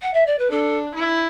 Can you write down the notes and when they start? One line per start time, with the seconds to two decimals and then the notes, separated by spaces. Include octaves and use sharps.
0.01 F#5
0.13 E5
0.26 D5
0.38 B4
0.50 D4 A4
0.95 E4